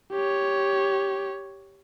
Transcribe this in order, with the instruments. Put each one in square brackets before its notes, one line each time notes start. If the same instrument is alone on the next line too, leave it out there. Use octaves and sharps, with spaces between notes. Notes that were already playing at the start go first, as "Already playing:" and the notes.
[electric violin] G4 C#5